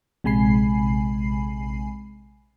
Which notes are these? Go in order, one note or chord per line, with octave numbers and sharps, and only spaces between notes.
A#1 C3 G#3 G#5 B5 C7